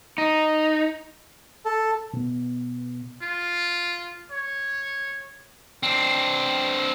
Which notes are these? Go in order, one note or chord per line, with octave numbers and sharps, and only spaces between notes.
D#4
A4
B2 B3
F4
C#5
C4 D4